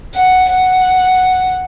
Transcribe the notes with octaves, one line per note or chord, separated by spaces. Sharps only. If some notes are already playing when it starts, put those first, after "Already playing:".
F#5
F#5